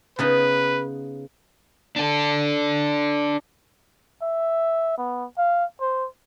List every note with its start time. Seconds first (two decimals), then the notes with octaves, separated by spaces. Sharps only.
0.19 C#3 B3 D#4 B4
1.96 D4 A4
4.22 E5
4.97 B3
5.37 F5
5.81 C5